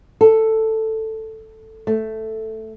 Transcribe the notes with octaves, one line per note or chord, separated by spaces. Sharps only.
A4
A3